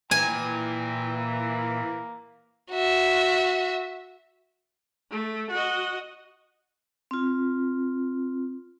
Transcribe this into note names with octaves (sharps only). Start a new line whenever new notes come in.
A#2 E3 G5 G#5
A#3
F#4 E5
A3
F#4 D#5
C4 F4